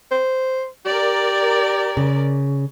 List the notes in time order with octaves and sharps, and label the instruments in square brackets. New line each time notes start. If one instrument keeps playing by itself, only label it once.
[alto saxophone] C5
[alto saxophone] G4 [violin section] A#4 D5
[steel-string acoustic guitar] C#3